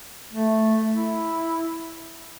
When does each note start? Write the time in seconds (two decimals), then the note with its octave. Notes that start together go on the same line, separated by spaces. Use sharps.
0.34 A3
0.91 E4